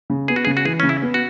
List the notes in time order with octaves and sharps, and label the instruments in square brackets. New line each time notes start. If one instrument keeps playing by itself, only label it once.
[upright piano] C#3
[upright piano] B3 [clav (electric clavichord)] G#4
[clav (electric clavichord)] F#4
[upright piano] C#3 [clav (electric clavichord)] G#4
[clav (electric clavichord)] F#4
[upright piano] E3 [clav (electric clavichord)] G#4
[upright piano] C#3 [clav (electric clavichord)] C#4
[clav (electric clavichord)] E4
[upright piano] B3
[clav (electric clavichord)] F#4